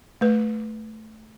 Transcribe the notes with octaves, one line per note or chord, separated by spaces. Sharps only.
A3 B4